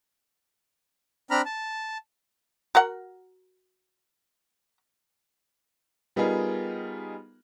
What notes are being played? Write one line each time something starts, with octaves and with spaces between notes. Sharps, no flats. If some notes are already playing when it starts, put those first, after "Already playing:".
C4 D4 A#5 B5 F6
A5
F#4 A#4 F#5
G3 B3 D#4 F4 G#4 A#4